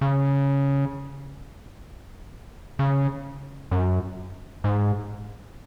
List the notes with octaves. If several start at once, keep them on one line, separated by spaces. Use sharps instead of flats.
C#3
C#3
F#2
G#2